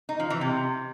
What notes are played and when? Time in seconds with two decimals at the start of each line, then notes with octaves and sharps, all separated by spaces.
0.09 D#4
0.20 F3
0.30 E3
0.41 C3